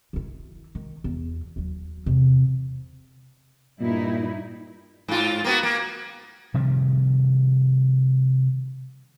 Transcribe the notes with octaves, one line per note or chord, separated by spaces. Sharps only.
D#3 E4
D#3
E2
D#2 F#3
E2 C3
G2 A#2 D#4 E4
G#2 F4
A#3 B3 F#4
A#3
C3 D#3 F3 G3